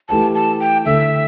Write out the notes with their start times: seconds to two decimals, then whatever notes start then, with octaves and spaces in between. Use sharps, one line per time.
0.09 E3 A3 G4 B4 A5
0.34 A5
0.60 G5
0.85 D3 A3 E4 A4 E5